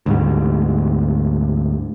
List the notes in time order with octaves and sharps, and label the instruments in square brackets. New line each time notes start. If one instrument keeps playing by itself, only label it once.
[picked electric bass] D2 G#2 G3